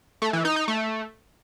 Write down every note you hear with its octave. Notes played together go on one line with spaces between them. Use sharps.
A3
E3
D#4
D#4
A3